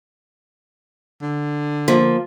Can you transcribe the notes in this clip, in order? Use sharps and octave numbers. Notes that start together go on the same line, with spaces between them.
D3
F3 A#3